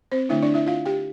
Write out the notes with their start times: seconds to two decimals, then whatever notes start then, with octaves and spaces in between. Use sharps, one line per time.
0.12 C4 C5
0.29 D3 A3 D4 E4 E5
0.43 D4 D5
0.54 E4 E5
0.66 F4 F5
0.85 G4 G5